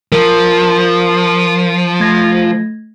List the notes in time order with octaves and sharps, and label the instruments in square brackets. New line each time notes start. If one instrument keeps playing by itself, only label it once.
[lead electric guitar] F3 [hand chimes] A#4
[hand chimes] A3 G#6 A#6